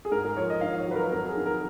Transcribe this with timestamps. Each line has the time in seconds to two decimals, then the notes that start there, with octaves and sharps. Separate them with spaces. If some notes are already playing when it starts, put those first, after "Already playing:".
0.05 G#4
0.11 G#2 A#4
0.24 A#4
0.37 F3 C#5
0.50 D#5
0.61 D#3 F5
0.78 C#5
0.87 F#3 B4
0.95 A#4
1.12 F2 A#4
1.28 G#4
1.37 D#3
1.46 A#4